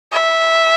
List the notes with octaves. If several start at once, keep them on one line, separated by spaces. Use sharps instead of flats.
E5